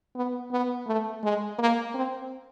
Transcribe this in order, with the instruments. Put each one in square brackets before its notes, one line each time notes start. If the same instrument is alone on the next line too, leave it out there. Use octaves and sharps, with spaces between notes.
[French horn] B3
B3
A3
G#3
A#3
C4